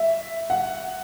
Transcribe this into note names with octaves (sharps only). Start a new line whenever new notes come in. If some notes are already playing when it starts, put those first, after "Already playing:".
Already playing: E5
F#5